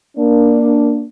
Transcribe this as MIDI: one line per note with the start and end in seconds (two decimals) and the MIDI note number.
0.17 1.05 58
0.17 1.05 62